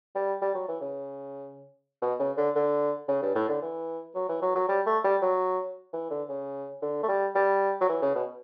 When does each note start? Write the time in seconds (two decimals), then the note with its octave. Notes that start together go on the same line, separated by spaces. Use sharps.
0.15 G3
0.42 G3
0.55 F#3
0.68 E3
0.81 C#3
2.02 B2
2.19 C#3
2.37 D3
2.55 D3
3.08 C#3
3.22 G2
3.35 A2
3.49 D3
3.62 E3
4.15 F#3
4.29 E3
4.42 F#3
4.55 F#3
4.68 G3
4.86 A3
5.04 G3
5.22 F#3
5.93 E3
6.10 D3
6.29 C#3
6.82 D3
7.03 A3
7.08 G3
7.35 G3
7.81 F#3
7.89 E3
8.02 C#3
8.15 B2